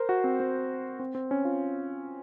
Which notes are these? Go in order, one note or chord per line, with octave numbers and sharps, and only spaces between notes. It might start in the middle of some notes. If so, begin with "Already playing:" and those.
Already playing: A#4 C5
F#4
C4
C4
C4
C4
C#4
F4